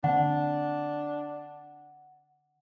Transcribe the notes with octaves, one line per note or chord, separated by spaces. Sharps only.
D3 A#3 C4 D4 F#5